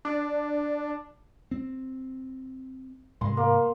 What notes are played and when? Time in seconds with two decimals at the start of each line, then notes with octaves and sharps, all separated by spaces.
0.05 D4
1.51 C4
3.21 G#2 C3 G#3 C6
3.37 A#3